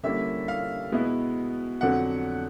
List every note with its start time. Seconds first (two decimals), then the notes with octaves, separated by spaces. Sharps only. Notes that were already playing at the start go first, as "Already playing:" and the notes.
0.03 D3 G3 A#3 C#4 E4 E5
0.48 F5
0.92 B2 G#3 B3 E4
1.81 F2 D3 F#3 F#5